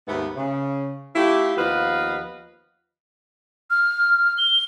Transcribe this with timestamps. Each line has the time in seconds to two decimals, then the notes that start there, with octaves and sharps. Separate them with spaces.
0.08 D#2 G#2 A3 B3
0.36 C#3
1.16 A3 E4 F4 G4
1.57 D#2 F3 B3 B4 D#5 F5
3.70 F6
4.38 G7